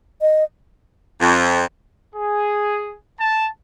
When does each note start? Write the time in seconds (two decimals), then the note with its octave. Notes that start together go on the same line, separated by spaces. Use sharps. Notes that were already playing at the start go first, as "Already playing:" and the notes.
0.21 D#5
1.20 F2
2.15 G#4
3.20 A5